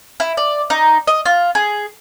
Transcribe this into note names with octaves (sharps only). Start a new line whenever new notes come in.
E4
D5
D#4
D#5
F4
G#4